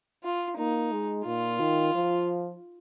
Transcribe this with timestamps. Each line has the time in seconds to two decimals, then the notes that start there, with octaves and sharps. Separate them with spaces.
0.24 F4
0.58 A#3 D#4
0.92 G#3
1.26 A#2 F4
1.60 D#3
1.94 F3